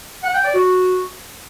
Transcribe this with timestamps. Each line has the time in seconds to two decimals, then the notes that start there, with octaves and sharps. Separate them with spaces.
0.23 F#5
0.34 G5
0.44 D5
0.55 F#4